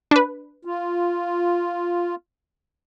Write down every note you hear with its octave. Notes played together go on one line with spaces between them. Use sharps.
D4 B4
F4